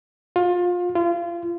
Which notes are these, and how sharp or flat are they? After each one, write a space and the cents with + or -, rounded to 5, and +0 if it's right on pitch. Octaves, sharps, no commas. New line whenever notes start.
F4 +25
F4 -30